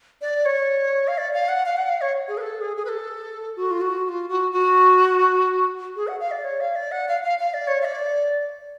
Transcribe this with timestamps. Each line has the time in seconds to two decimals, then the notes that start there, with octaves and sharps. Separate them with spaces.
0.22 D5
0.45 C#5
1.08 F5
1.18 D5
1.33 F5
1.49 F#5
1.66 F5
1.77 F#5
1.89 F5
2.01 C#5
2.28 G#4
2.37 B4
2.41 A4
2.61 G#4
2.76 G#4
2.85 B4
2.89 A4
3.56 F#4
3.71 F4
3.81 F#4
4.04 F#4
4.09 F4
4.29 F#4
4.52 F#4
5.96 G#4
6.08 F#5
6.20 F5
6.31 D5
6.44 C#5
6.60 F5
6.76 D5
6.92 F#5
7.08 F5
7.24 F5
7.39 F5
7.54 D5
7.67 C#5
7.81 F5
7.85 D5